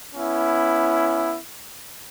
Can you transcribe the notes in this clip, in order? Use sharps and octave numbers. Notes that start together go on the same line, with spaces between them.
B3 C#4 E4